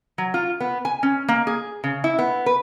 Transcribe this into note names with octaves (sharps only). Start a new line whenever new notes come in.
F#3
F4
B3
G#5
C#4
A#3
G#4
C#3
E4
B3
B4